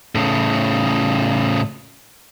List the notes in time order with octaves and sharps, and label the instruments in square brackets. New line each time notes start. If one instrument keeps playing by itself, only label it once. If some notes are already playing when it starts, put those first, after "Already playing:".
[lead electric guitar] A2 C#3